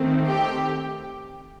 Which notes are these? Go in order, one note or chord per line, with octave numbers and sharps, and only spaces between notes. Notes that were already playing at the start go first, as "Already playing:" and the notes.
Already playing: D#3 A3 C4
G4